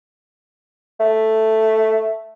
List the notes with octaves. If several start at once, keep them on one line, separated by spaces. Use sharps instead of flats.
A3